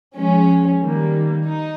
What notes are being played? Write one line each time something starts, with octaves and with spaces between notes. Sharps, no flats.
F3 G#3 C#4
D#3 G3 A#3
D#4